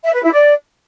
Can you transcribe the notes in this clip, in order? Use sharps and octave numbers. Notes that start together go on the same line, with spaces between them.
E5
B4
E4
D5